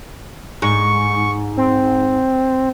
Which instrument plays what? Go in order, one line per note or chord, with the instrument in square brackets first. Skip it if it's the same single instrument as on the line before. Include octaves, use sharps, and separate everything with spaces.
[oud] G#2 [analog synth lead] C#6
[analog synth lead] C4